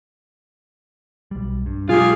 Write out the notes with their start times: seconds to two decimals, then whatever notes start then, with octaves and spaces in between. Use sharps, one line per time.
1.31 B1 G3
1.66 G2
1.89 B2 F#3 G#3 F4 G4 G#4 F5